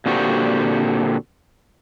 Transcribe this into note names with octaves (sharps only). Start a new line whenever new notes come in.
A#2 D3 C4 F#4 G4